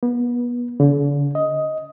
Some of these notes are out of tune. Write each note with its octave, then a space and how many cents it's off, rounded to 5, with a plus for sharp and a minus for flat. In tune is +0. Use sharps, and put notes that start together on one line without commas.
B3 -30
D3 -45
D#5 +10